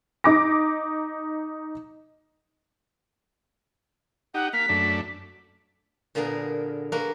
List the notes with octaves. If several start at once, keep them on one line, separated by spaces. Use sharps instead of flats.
D#4 D6 A#6
D#4 G4 F#5
A#3 F5 B6
F#2 A3 D4
A#2 D3 B3 G#4 A#4
G#3 A#3 F#4 A#4 B4